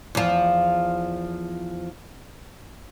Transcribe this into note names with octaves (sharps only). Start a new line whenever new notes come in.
E2 F3